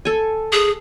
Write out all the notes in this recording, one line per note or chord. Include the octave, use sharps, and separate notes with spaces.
A4 G#5
G#4